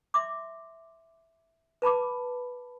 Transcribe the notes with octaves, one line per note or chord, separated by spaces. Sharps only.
E5 C6 D6
B4 A5 B5 D6